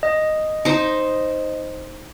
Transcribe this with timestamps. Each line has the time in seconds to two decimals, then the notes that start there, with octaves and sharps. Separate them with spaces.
0.03 D#5
0.65 D#4 C5